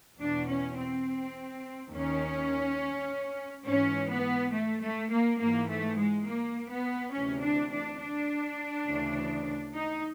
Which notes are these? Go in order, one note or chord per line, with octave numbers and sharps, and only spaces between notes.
E2 B2 D4
C#4
C4
D#2 D#3 C#4
G#2 E3 C#4
B3
A3
A3
A#3
G#2 E3 A#3
A3
G#3
A#3
B3
D2 C3 E3 C#4
D4
D4
D4
D2 C#3 E3
D#4